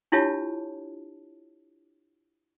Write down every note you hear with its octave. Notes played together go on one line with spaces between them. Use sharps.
D4 E4 F4 G4 C#5 A5